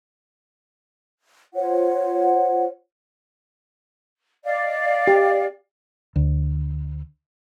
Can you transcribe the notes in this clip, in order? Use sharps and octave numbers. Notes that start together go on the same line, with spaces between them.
F4 C5 C#5 F#5
D5 D#5 F5
G4
D2